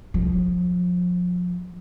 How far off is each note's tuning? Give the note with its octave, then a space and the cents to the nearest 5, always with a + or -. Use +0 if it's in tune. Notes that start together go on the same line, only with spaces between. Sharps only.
F3 +35